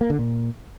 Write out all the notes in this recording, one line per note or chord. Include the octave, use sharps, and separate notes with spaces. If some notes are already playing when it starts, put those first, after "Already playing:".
A#3
D3
A#2